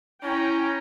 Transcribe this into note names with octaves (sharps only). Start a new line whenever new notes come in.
C#4 E4 G5 A#5